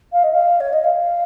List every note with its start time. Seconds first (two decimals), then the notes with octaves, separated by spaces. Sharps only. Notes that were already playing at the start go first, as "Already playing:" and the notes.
0.12 F5
0.23 D#5
0.33 F5
0.60 C#5
0.73 D#5
0.84 F5